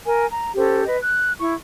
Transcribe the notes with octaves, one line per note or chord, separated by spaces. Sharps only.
A#4 G#5
A#5
C#4 G4 A4 C5
B4 D#5
F#6
E4 C#6